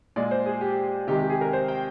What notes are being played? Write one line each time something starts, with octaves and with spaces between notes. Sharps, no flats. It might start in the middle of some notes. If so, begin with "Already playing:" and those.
A#2 G#3 D5
C5
G#4
G4
C3 D#3 G#3 G4
G4
G#4
A#4
C5
G5